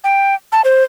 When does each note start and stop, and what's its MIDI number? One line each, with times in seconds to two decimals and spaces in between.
0.04 0.35 79
0.52 0.61 81
0.65 0.84 72